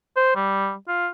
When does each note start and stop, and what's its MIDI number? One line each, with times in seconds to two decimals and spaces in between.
0.16 0.36 72
0.36 0.75 55
0.88 1.09 65